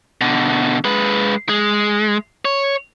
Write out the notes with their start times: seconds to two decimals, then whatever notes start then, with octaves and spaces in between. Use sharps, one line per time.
0.21 B2 D3
0.84 G#3 B4
1.49 G#3
2.45 C#5